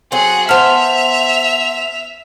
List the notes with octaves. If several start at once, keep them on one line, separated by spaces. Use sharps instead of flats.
F#3 C4 G#4 F#5
B3 C5 E5 F#5 A5 F6 F7